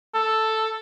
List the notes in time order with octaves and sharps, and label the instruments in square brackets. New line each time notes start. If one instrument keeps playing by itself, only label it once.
[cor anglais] A4